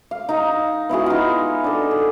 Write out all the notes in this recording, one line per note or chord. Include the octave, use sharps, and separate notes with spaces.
F5
D#4 F5 A#5
B3 E4 F#4 G#4
D#4 F4
D4 A4
G#4